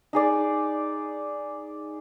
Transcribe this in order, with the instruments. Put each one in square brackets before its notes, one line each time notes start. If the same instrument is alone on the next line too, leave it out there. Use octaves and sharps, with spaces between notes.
[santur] D#4 G#4 D5